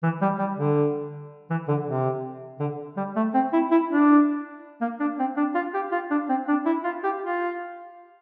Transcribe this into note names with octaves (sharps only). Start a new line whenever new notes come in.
E3
G3
G3
D3
E3
D3
C3
D3
G3
A3
C4
E4
E4
D4
A#3
D4
C4
D4
F4
G4
F4
D4
C4
D4
E4
F4
G4
F4